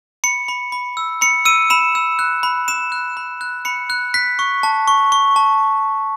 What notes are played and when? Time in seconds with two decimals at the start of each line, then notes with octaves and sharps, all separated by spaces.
0.24 B5 C#7
0.48 B5
0.72 B5
0.97 E6
1.21 B5 C#7
1.45 E6 D#7
1.70 B5 E7
1.95 E6
2.19 F#6
2.43 B5
2.68 B5 E7
2.92 F#6
3.17 B5
3.41 F#6
3.65 B5 C#7
3.90 F#6
4.14 F#6 B6
4.39 C#6
4.63 A5
4.88 C#6
5.12 C#6
5.36 A5